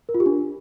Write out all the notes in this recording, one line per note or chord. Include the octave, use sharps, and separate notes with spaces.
A#4
F4
G4
D4